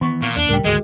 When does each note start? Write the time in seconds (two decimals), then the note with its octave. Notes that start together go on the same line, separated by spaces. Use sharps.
0.01 D#3 E3 B3 C#6
0.22 A#2 A#3 F5 C#6
0.36 E2 D4
0.49 C#2 A2 G3 A#4 G5
0.65 G#1 D2 G#3 F#4 G#4 D#5